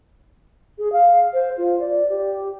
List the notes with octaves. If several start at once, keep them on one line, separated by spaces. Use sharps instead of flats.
G#4
F5
C5
F4
D5
G4